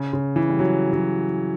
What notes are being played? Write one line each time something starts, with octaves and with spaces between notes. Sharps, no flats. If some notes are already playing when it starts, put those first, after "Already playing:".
Already playing: C#3
C#3
E3
G3
F#3
F#3